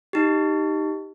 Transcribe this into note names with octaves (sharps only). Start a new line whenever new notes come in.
D#4 G4